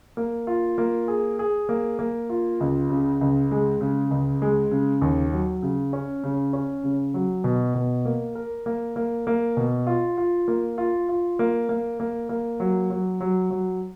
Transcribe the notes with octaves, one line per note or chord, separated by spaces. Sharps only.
A#3
F4
A#3
G#4
G#4
A#3
A#3
F4
C#2
C#3
C#2
G#3
C#3
C#2
G#3
C#3
D#2
F#3
C#3
C#4
C#3
C#4
C#3
F#3
B2
B2
A#3
A#4
A#3
A#3
A#3
B2
F4
F4
A#3
F4
F4
A#3
A#3
A#3
A#3
F#3
F#3
F#3
F#3